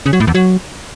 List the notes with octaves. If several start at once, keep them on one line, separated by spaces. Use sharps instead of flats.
C#3
F#3
A2
E2
F#3